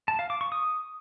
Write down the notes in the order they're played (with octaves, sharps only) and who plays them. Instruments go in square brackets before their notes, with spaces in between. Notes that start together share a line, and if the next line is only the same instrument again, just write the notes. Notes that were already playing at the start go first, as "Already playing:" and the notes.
[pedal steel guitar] A5
F5
D6
C#6
D#6